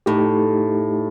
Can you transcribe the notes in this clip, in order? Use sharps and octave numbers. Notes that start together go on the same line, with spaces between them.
A2 A3 D#4 G4